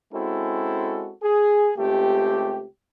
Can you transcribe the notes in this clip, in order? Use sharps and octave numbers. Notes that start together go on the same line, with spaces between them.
G#3 C4 C#4 E4 F#4 A4
G#4
C#2 A3 C4 G4